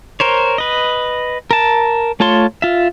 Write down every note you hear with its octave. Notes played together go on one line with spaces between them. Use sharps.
A#4 C5 C#5
B4 D#5
A#4 A5
A3 F4 C#5 A5 C6
F4 E5